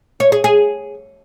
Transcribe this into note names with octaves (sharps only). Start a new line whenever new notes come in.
C#5
G#4
G#4